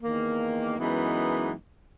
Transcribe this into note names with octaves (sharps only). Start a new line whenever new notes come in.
E2 D#3 A#3
F#2 E3 G#3 B3 D#4